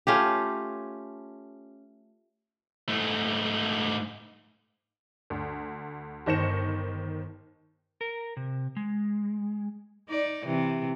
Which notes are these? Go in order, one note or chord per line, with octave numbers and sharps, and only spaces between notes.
A3 C#4 F4 G4
G#2 A3
D2
G1 D#3 C5 A#6 C#7 E7
A#4
C3
G#3
D#4 D5
C3 E3